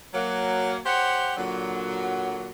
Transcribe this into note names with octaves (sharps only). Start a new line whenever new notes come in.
F#3 A#3
G4 C5 C#5 F#5
A#2 D3 F#3